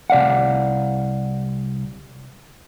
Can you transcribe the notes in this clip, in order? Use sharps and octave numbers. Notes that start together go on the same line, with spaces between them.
C2 D5 F5 F#5